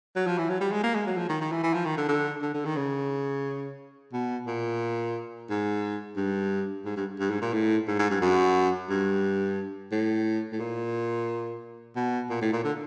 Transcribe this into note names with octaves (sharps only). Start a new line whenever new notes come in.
F#3
F3
E3
F#3
G3
G#3
A#3
G#3
F#3
F3
D#3
D#3
E3
E3
F3
D#3
D3
D3
D3
D3
D#3
C#3
B2
A#2
G#2
G2
G#2
G2
G2
G#2
A#2
A2
G#2
G#2
G2
F#2
G2
A2
A2
A#2
B2
A#2
A2
A#2
D3